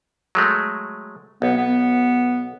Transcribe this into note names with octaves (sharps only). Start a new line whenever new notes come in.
F#3 G#3 A3
B1 B3
B3